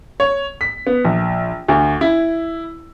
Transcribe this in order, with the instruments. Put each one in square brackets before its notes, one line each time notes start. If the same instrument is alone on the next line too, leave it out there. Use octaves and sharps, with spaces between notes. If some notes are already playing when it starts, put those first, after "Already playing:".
[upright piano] C#5
B6
B3
A#1
D2
E4